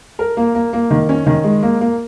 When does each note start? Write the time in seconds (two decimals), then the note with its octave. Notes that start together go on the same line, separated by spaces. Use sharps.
0.19 A#4
0.37 A#3
0.55 A#3
0.73 A#3
0.91 D#3
1.09 C#4
1.27 D#3
1.44 G#3
1.63 A#3
1.81 A#3